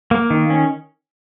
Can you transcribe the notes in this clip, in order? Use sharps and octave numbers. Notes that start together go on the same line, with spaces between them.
A#3
D#3
C#4